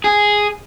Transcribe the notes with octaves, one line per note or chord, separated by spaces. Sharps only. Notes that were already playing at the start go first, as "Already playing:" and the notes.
G#4